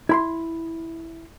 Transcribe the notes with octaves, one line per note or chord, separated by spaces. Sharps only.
E4 B5 C6